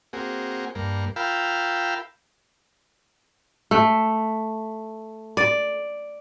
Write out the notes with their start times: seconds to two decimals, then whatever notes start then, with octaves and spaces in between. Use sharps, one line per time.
0.13 A#3 C4 F#4 G#4
0.75 G2 A#3
1.16 F4 A#4 F5 G5 B5 E6
3.71 A3
5.37 D5